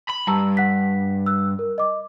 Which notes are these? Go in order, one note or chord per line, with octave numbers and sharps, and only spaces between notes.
B5
G2 A5 A#5 E6
F#5 F#6 B6
E6 F#6
A#4
D#5 D6